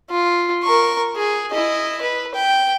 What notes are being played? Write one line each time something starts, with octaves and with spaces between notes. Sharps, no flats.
F4
A#4 C#6
G#4
E4 D#5
B4
G5